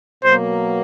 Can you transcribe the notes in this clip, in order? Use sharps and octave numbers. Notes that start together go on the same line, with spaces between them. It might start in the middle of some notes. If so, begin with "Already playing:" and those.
B2 F#3 A#3 C5